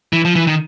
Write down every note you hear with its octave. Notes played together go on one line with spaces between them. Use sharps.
E3
F3
E3
D#3